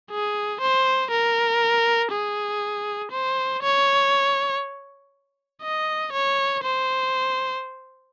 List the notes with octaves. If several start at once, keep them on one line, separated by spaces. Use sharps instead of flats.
G#4
C5
A#4
G#4
C5
C#5
D#5
C#5
C5